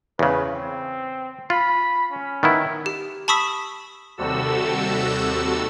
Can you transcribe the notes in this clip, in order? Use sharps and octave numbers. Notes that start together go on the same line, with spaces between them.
E2 C#3 B4
C4
F4 B5
C#4
D#3 B3 E4
G4
A5 B5 C#6 D#6 E6 B6
D#2 C3 G3 F#4 A4 E6